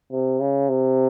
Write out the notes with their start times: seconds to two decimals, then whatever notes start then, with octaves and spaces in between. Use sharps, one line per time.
0.12 C3
0.40 C#3
0.69 C3